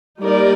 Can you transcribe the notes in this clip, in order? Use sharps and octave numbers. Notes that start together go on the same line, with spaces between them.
G3 A#3 D#4 A#4 D5